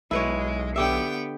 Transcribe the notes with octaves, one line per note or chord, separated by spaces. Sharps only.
B1 G#3 E4 B4 C#5
D3 B3 G4 E5 G5